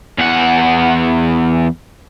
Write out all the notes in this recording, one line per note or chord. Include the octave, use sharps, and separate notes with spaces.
E2 F#5